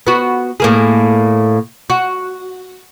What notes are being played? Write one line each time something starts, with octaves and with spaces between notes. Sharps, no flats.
B3 F#4
A2 A#3 G#4
F#4